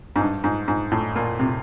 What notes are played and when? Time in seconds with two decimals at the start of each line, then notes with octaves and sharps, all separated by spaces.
0.16 G#2
0.21 G2
0.44 G#2
0.68 G#2
0.91 A2
1.16 A#2
1.39 C3